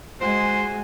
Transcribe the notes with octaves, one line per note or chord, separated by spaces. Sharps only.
G#3 F#4 C5 G#5